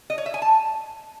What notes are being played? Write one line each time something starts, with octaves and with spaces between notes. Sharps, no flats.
D#5
C#5
E5
G#5
A5